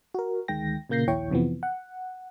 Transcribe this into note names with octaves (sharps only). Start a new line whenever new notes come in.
F#4 A#4
D2 D#3 G#3 G5 A#6
A#2 C#3 A#3 G6 A#6 C7
A#1 D#2 E4 C#5 G5 C#6
F2 C3 E3 F3 B3
F#5